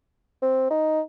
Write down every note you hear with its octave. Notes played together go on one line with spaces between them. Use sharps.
C4
D#4